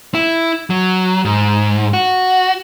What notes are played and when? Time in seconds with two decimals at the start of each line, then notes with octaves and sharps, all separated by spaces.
0.15 E4
0.70 F#3
1.25 G#2
1.93 F#4